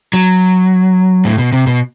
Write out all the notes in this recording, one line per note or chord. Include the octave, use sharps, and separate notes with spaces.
F#3
A2
B2
C3
B2